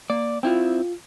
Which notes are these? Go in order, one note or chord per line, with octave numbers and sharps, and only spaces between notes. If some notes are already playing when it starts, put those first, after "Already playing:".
A#3 D5
C4 E4 F4 G5